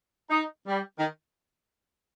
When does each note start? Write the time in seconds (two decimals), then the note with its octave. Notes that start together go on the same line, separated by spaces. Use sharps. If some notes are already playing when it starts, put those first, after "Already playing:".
0.30 D#4
0.67 G3
0.97 D#3